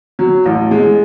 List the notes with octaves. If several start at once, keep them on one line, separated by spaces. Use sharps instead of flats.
F#3
A1
G#3